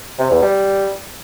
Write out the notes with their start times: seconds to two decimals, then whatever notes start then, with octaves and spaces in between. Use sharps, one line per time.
0.19 C3
0.30 E2
0.42 G3